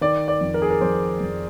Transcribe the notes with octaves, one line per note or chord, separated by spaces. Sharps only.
D#3 D5
D5
F2
A#4
G#4
A#4
F2 C5
F2